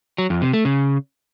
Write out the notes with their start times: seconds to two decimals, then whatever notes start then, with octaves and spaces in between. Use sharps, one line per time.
0.18 F#3
0.30 F2
0.42 C3
0.53 A3
0.65 C#3